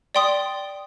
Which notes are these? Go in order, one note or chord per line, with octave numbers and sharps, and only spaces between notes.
D5 G5 C6 D#6